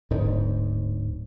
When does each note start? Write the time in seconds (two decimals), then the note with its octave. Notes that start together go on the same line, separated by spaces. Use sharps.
0.10 D1 G#2